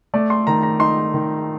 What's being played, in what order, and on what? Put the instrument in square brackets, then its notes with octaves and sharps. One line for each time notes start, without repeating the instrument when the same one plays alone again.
[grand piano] A3 [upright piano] D5
[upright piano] C6
[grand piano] D#3 [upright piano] A#5
[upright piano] A#5
[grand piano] D#4 [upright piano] C6
[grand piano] D#3